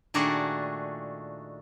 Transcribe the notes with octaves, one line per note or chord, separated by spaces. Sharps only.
A#2 D#3 A3 D4 F#4 G#4